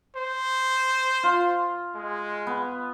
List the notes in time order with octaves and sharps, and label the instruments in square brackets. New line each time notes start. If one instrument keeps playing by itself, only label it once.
[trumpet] C5
[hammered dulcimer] F4
[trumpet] G#3
[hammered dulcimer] B3